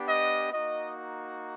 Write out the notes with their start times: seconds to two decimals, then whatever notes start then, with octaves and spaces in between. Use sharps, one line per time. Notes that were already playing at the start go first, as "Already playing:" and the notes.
Already playing: B3 D4 G4
0.09 D#5
0.52 A#3 D#4 F#4 D#5